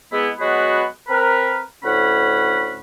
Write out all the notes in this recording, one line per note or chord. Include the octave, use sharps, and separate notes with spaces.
G#3 B3 E4
F#3 G#3 B3 F#4 G#4 B4
C4 A#4 B4
D2 A2 C#4 F#5 B5